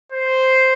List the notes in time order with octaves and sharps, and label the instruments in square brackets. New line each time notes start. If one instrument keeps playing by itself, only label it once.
[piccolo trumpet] C5